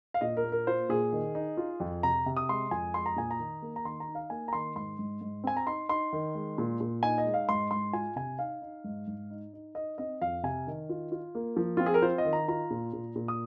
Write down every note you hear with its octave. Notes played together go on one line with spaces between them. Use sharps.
F5
A#2 D#5
A#4
A#3
A#4
F4 C5
A#2 G#4
D#3
D#4
F4
F2
C3 A#5
C3
D#6
G#3 C6
F2 G#5
G#3 C6
A#5
A#2 G#5
A#5
D#3
A#3
A#5
D#3 C6
A#5
D#4
F5
A#3 G#5
A#5
D#3 C6
G#2 C6
G#2
G#2
C4 G#5
A#5
D#4 C6
D#4 C6
D#3
G#3
A#2
A#2
D#4 G#5
D#5
G#3
F5
G#2 C6
G#2 C6
F4 G#5
C3 G#5
D#4 F5
D#4
G#2
G#2
D#4
D#4
D#4 D#5
C4 D#5
F2 F5
C3 G#5
D#3
F4
F4
A#3
F3
C4 F4
G#4
A#4
F4 C5
D#5
D#3
A#5
F4 A#5
A#2
A#2
A#2
D#6